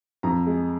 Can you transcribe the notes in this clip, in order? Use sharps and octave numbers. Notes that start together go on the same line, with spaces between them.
F2 A#5
G#3